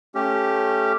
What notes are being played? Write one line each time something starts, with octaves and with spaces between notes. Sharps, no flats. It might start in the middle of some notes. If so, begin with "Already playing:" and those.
A3 C#4 G4